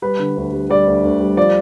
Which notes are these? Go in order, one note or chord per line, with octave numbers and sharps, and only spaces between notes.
G3 B4
D3
D2
G3
G3 D5
D2
D2
G3
F3 D5